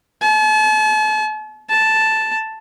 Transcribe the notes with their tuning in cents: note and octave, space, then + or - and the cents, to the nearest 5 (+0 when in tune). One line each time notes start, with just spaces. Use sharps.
A5 -40
A5 +0